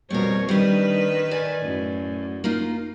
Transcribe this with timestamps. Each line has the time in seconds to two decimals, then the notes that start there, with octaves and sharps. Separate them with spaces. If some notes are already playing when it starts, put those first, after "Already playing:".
0.10 F2 B2 G3 A#4 C#5
0.49 D#3 G3 D4 B4
1.31 D5 G#5
1.62 F#2 A2
2.44 A#3 D#4 F4